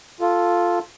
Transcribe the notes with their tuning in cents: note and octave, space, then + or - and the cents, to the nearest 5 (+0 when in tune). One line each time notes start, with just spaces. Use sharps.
F4 +0 A4 +0